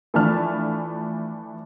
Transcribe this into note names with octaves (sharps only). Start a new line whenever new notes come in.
E3 F3 A3 D4 A5 F6